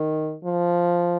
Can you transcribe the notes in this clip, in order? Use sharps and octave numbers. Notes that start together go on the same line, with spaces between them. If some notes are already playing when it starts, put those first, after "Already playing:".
Already playing: D#3
F3